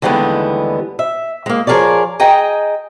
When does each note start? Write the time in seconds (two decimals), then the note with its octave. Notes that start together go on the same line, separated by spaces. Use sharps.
0.02 D#2 D3 E3 G3 G#3 B3
0.99 E5
1.46 G#3 A#3
1.67 F3 G#4 A#4 C#5 D5
2.20 G#4 D#5 G5 A#5